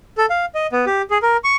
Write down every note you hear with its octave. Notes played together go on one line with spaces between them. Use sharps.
A4
F5
D#5
B3
G4
G#4
A#4
C#6